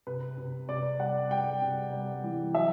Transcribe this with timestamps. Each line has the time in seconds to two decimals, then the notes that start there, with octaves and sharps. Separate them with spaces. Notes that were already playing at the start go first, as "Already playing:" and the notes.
0.07 C3 B4
0.38 C3
0.69 C3 D5
0.99 G3 F#5
1.31 G3 G5
1.62 C3
1.92 G3
2.24 E3
2.54 F#3 E5